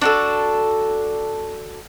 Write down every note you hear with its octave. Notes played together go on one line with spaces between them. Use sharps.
D4 F#4 A4